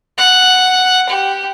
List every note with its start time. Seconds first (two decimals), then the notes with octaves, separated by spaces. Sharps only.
0.18 F#5
1.09 G4